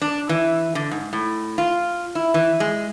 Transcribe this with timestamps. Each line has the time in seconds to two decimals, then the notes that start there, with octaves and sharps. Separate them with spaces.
0.02 D4
0.29 E3
0.75 D3
0.91 G#2
1.13 A2
1.58 F4
2.15 E4
2.34 E3
2.60 G#3